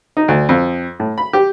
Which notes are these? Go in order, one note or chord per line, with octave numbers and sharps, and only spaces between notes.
D#4
D2
F2
A2
B5
G4